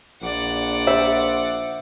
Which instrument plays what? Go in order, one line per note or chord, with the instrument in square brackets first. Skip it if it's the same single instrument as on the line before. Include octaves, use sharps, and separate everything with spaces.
[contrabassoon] A#1 [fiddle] D5 F#5
[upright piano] C5 [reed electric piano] E5